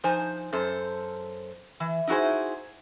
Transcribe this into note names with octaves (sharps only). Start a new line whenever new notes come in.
F3 D#4 C5 G#5
F#2 A4 C5
E3
D#4 E4 F#4 G#4 C5